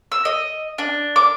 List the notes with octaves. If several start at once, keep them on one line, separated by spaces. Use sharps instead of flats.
E6
D#5
D4
D6